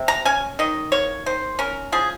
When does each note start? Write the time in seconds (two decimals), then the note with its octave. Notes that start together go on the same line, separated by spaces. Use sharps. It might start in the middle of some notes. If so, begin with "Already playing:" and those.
Already playing: C3
0.08 A#5
0.25 C#4 G#5
0.59 D#3 D#5
0.92 A#3 C#5
1.26 D#3 C5
1.59 C#4 A#4
1.92 F3 G#4